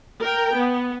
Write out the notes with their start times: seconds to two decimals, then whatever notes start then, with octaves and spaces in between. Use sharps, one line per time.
0.20 A#4 G5
0.53 B3